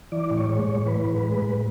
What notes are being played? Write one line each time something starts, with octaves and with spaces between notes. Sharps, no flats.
E3 D5
A2
C#5
G#3
C#5
A2
E3 B4
A2
G#3
A2